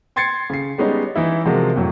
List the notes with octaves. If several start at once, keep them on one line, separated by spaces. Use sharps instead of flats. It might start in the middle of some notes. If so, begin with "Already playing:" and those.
G5 C6 G#6 A6 C7 C#7
C#3 C7
G3 G#3 B3 C#4 D#4
E3 D#4 E4
C3 F3 G#3 F#4 A#4
F2 A2 F#3